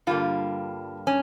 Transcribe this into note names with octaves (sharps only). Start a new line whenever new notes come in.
G2 D3 G3 A#3 F4
C#4